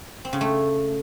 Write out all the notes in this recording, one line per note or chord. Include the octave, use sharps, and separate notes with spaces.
C4
C#3
A3